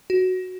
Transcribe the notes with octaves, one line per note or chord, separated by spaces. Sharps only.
F#4